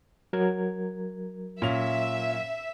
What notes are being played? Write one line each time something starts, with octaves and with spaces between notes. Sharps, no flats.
F#3 A#4 G#6
A#2 C#4 E5 F7